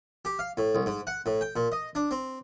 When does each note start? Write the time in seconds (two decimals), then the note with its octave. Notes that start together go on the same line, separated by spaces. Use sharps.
0.25 G4
0.39 F5
0.57 A2
0.75 C2
0.86 G#2
1.07 F#5
1.26 A2
1.41 G5
1.56 A#2
1.72 D#5
1.95 D4
2.11 C4